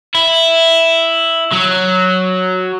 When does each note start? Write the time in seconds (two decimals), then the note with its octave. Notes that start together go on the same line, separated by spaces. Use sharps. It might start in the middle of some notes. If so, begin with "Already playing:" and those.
0.15 E4
1.52 F#3